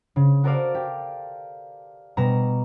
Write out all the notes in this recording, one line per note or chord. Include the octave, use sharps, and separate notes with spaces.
C#3
F#4 A4 A#4 C5 D5 F5
G4
B2 G3 A#5 E7